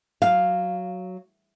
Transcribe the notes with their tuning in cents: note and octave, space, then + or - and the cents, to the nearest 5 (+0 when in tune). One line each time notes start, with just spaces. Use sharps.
F#3 +0 F5 +0